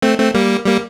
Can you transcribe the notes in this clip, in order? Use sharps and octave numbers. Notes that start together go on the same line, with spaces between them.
A3 C4
A3 C4
G3 A#3
G3 A#3